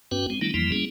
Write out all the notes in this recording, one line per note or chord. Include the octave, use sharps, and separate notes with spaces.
G2 B3 C#4 F#4 B4 G5
G#3 C4
D#3 G3 A3 B3 D4 E4
F2 E3 F3 G3 A#3 E4
G3 A#3 B3 C#4 E4 G#4